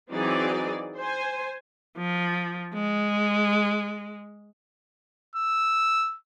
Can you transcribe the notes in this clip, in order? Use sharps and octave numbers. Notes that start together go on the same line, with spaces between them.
E3 F#3 C4 D#4 G#4 D5
C5 G#5
F3
G#3
E6